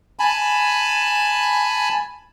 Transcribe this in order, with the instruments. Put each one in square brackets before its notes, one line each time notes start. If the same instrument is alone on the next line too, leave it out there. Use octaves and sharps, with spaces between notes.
[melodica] G#5 A5 B5